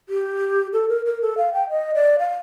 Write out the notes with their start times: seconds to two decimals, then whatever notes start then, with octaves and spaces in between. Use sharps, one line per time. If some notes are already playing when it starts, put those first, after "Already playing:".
0.09 G4
0.73 A4
0.89 A#4
1.06 A#4
1.22 A4
1.38 F5
1.54 G5
1.70 D#5
1.94 D5
2.19 F5